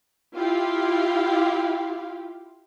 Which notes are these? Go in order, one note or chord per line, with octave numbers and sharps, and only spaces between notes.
E4 F4 G4 F5